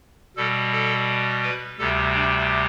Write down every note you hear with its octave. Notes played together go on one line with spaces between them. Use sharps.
B2 G3 A4
A4
B4
D2 C3 G3 A4
D4